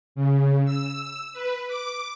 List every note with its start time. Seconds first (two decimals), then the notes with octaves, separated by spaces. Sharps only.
0.15 C#3
0.65 E6
1.33 B4
1.68 D6